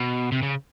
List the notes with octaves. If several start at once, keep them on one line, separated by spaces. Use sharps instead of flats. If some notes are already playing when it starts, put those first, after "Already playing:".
Already playing: B2
C3
C#3